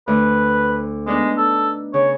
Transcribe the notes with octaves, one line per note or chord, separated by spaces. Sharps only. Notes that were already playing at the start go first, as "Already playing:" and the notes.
D2 B4
G#3 B3 D4 D#4
A4
C#3 C#5